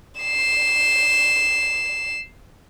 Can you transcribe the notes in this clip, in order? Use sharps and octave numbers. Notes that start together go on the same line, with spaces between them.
C7 E7